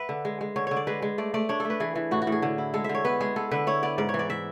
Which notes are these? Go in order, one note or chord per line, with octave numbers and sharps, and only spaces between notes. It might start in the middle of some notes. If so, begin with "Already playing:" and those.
Already playing: B4 E5 F#5
D3
G#3
G#3
D3 C#5
D3 C#5
D5
G#3 B4
G#3
A3 D5
A3 D5
D4 C#5
A3 A4
B4
E3 G#4
E3
A2 F#4
F#4
A2
G#4
D3
E4
G#3 A4
E5
D3
C#5
B3 B4
G#3 G#4
B3 A4
D3 B4
E4 C#5
B3 D5
G#2 D5
C#5
E3
D5
E3 E5